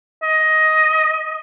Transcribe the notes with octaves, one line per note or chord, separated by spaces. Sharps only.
D#5